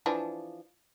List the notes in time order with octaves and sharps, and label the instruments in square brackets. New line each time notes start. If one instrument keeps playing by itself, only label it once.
[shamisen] E3 F3 D4